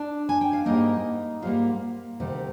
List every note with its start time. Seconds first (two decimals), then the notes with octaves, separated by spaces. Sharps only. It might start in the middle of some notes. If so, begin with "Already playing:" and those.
Already playing: D4 D5
0.29 G#5
0.41 G5
0.53 F5
0.66 G#2 G3 A#3 D#4 D#5
1.42 G#2 G3 A#3 F4 F5
2.20 D2 C3 D#3 G3